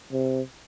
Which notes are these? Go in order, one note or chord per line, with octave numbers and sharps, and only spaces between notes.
C3